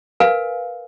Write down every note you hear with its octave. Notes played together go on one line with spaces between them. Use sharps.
A#4 B4 F5 G#5